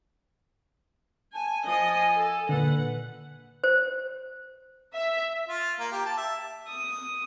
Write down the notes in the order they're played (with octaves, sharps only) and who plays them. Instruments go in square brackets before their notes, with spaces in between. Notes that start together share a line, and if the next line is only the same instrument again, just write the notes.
[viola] G#5 [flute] A5
[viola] F3 D#5 [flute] G#5
[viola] A4
[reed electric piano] A#2 D3 [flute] B4 [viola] F#5
[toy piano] C5
[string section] E5
[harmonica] F4
A#3
G4
A5
E5
[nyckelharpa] D#6